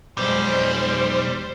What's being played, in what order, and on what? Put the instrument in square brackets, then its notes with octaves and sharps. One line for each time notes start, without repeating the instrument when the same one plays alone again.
[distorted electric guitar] B1 [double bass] F2 G#3 [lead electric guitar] G3 [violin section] C5